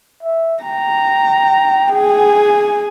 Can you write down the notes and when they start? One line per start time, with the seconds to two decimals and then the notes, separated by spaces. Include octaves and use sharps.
0.23 E5
0.63 G5 A#5
1.93 G#4 G#5